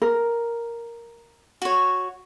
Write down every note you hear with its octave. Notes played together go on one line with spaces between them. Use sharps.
A#4
F#4 C#5